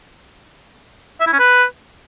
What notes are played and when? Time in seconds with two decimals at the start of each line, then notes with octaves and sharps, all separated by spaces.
1.20 E5
1.27 E4
1.33 C#4
1.39 B4